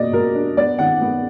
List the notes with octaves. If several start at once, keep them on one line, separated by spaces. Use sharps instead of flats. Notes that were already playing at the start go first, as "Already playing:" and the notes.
Already playing: B2 A#3 D5 D#5
B2 A#4
D4
B3 D5
D#3 F#5
B3